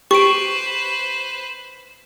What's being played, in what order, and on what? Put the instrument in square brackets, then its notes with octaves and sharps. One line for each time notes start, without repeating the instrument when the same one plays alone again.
[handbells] G4 [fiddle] B4 C5 [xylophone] C#6 D7